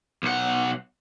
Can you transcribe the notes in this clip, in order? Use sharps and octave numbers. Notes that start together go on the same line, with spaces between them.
B1 F#5